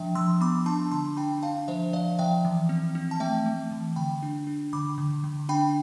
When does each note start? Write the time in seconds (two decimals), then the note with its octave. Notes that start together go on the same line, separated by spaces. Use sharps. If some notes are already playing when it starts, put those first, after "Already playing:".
Already playing: F3 D4 E5 G5
0.15 F3 C6 E6
0.41 B3 B5 D6
0.66 D4 A5 C6
0.92 D3 A5 C6
1.17 D4 G5 B5
1.43 D4 F5 A5
1.68 F3 C5 E5
1.93 F3 D5 F5
2.19 F3 E5 G5
2.45 E3
2.69 C4
2.95 C4
3.11 A5
3.20 A3 E5 G5
3.46 A3
3.71 E3
3.96 D3 G5 B5
4.22 D4
4.47 D4
4.73 D3 B5 D6
4.98 D3
5.24 D3
5.49 D4 G5 B5